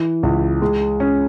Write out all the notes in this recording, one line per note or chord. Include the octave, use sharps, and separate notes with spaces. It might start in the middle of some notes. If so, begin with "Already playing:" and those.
Already playing: E3
C#2
G#3
C#4